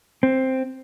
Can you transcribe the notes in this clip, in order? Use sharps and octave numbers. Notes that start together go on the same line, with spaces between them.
C4